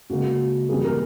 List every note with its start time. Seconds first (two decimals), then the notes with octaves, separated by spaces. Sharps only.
0.10 C#2 C#3 F#3 A#3 F#4
0.69 G2 E3 G3 A#3 G#4
0.84 A#4